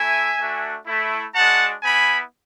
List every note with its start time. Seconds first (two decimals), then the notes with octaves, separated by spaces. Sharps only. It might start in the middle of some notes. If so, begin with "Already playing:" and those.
Already playing: A3 E4 E5 G#5
0.37 A3 D4 F#4
0.86 A3 E4
1.35 G#3 D4 F#4 F#5 A5
1.83 B3 E4 G#5 B5